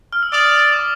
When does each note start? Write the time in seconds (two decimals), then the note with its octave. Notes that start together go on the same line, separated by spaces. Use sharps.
0.13 F6
0.23 E6
0.33 D5 D#6
0.73 D6